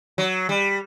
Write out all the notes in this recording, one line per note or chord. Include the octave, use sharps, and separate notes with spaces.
F#3
G3